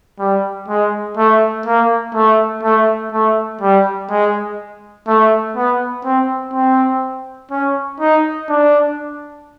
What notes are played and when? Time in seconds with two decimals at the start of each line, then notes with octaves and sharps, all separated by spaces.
0.19 G3
0.68 G#3
1.17 A3
1.66 A#3
2.15 A3
2.63 A3
3.12 A3
3.61 G3
4.10 G#3
5.07 A3
5.56 B3
6.05 C4
6.54 C4
7.51 C#4
8.00 D#4
8.49 D4